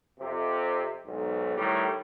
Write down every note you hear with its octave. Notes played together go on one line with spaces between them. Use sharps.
F2 C3
B1 G#2
A2 D#3 G3